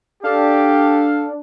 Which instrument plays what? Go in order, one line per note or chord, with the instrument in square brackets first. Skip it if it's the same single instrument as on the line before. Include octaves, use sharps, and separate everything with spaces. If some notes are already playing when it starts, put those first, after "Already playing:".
[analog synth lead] D4 [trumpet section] G4 [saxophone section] A4 F5